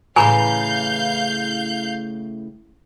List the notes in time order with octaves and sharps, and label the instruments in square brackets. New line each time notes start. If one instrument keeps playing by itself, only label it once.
[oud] A2 C#3 E3 [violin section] F5 G6 [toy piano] G#5 A#5 B5